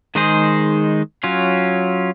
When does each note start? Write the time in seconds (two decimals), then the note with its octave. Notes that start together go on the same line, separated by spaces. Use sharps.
0.15 D#3 G#3 D#4 G#4 C5
1.23 F#3 C#4 F4